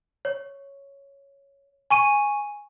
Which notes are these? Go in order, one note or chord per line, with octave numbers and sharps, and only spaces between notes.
C#5
G#5 C#6 D#7